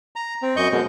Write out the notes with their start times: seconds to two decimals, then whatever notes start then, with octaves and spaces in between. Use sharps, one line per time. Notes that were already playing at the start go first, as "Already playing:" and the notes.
0.16 A#5
0.42 C4
0.56 F#2 D#5 C#6 G6
0.72 F#2 B2 G#3